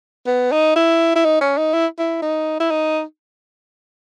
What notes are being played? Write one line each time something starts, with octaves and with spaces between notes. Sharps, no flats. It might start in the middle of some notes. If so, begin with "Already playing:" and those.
B3
D#4
E4
E4
D#4
C#4
D#4
E4
E4
D#4
E4
D#4